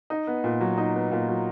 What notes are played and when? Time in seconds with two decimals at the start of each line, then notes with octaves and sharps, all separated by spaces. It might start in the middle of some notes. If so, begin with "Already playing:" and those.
0.10 D#4
0.27 B3
0.44 A#2
0.61 F#3
0.78 D#4
0.95 B3
1.12 A#2
1.28 F#3